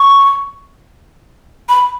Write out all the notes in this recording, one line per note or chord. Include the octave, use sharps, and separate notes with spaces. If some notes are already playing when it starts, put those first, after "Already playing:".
Already playing: C#6
B5